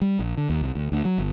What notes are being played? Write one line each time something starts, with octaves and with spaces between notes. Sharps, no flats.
G3
A#1
D3
D#2
C2
D2
D2
F#3
G1